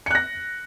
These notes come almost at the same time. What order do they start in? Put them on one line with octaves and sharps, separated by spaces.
C#7 F#6 A#6